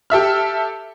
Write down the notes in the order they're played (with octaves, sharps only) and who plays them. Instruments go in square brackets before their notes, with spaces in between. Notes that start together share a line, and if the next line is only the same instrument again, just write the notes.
[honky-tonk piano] G4 A4 E5 F6